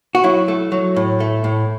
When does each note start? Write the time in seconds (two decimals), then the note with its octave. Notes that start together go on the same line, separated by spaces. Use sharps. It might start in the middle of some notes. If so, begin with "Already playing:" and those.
0.15 F#4
0.24 F#3 E4
0.48 A3
0.72 F#3
0.96 A2
1.20 A3
1.44 A2